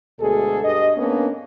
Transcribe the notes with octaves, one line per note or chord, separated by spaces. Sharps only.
D2 B2 G#3 G#4 A4
G2 D#5
A#3 B3 C#4 D4